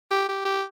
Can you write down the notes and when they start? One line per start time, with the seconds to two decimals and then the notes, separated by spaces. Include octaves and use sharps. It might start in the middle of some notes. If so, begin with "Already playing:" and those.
0.11 G4
0.28 G4
0.45 G4